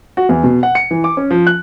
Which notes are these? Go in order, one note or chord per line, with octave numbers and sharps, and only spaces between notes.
F#4
E2
B2
F#5
C#7
E3
D6
C#4
F3
F#6